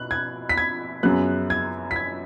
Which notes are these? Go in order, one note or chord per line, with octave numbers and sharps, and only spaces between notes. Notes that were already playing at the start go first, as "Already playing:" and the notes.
Already playing: B2 F#6
G#6
B6
G#6
F#2 C#3 F#3 B3 F#6
G#6
B6
G#6